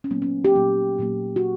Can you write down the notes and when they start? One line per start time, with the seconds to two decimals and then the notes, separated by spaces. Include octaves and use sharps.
0.04 C#4
0.11 A#2 F#3 A#3 B3
0.22 C#4
0.45 G4
0.54 A#2 F#3 A#3
0.98 A#2 F#3 A#3
1.36 F#4